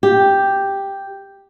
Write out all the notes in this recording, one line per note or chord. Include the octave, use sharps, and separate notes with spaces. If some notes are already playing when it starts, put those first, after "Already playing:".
G4